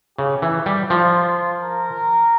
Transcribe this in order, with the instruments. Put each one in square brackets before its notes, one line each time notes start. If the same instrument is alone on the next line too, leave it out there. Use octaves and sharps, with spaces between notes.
[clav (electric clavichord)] C#3 [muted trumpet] G4
[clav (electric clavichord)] E3
G3
[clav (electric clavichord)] F3 [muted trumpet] F4
[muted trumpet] A#4